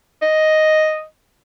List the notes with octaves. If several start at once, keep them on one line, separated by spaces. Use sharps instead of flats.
D#5